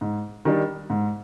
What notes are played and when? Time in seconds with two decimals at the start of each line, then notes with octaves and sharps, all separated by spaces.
0.01 G#2
0.45 D#3 G3 D4
0.90 G#2